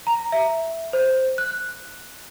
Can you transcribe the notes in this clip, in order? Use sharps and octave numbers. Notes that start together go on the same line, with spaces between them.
A#5
E5
C5
F#6